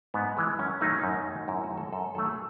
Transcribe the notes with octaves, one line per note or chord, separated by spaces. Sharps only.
G#2 B3
E3 G#3
F#2 C#4
D#3 F#3 A3 D#4
C#4
F#2 D#4
D#3 F#3 A3
F#2 E4
F#4
D#3 F#3 A3
A4
F#2 A4
D#3 F#3 A3 A4
G#4